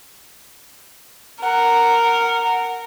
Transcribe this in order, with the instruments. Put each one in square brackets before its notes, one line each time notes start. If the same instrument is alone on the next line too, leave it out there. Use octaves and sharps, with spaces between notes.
[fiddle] A#4 [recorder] F#5